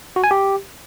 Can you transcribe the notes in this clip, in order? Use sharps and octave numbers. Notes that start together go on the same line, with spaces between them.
F#4
G#5
G4